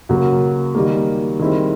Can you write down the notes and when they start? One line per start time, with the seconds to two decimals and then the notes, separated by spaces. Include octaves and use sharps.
0.09 F#2 C#3 F#3 A#3
0.75 D#3 G3 A#3
1.39 D#3 G3 C4 E4 G#4